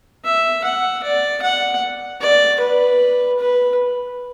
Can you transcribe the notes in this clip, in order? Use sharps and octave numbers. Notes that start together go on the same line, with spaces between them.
E5
F#5
D5
F#5
D5
B4
B4